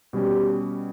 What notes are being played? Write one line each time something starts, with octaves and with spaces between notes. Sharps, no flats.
B2 G3 C#4 G4